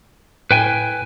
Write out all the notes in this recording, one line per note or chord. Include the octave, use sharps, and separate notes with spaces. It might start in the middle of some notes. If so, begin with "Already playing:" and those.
A2 B4 G5 G#5